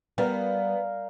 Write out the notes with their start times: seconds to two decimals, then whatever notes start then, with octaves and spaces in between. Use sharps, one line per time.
0.18 G3 B3 A#4 F5 G5